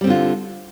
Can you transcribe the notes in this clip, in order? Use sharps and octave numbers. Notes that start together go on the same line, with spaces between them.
D3 G3 C4 F4